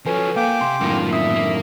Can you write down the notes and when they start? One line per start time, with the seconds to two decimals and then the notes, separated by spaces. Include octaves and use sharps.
0.06 F3 F#3 C#4 A4 B4 G#5
0.36 A#2 A#3 F5 G5 G#5 D6
0.61 C3 C6
0.81 F#2 A2 D#3 A#3 F4
1.11 C4 E5 D#6
1.35 A#3 A#4